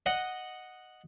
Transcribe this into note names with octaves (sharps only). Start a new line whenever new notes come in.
D#5 F#5